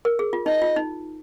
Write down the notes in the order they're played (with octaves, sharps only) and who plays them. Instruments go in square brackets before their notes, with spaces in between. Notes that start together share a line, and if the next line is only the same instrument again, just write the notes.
[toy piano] A#4
G#4
F4
[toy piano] D#4 [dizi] D#5
[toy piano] F4
D#4